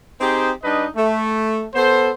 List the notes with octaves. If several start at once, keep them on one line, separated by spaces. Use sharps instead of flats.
C4 D#4 G4 G#4 C5
G3 D4 D#4 B4 D#5
A3
B3 A4 C5